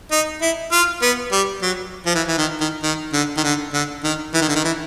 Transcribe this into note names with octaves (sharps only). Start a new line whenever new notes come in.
D#4
E4
F4
B3
G3
F#3
F3
E3
E3
D#3
D#3
D#3
D3
D#3
D3
D3
D#3
E3
D#3
D3
D#3
E3